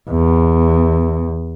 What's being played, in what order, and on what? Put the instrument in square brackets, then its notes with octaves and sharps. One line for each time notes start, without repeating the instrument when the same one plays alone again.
[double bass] E2